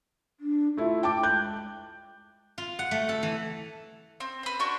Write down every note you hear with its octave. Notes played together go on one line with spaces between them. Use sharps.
D4
A3 E4 F4
G5 A5 D6
G#3 F#6 G6
F4
F#5
A3
A4
E3
C4
B4 C5
D4 F#4 C6 C#6